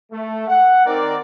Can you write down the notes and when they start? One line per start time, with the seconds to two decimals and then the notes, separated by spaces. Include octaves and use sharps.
0.12 A3
0.48 F#5
0.86 D#3 C4 A#4 D5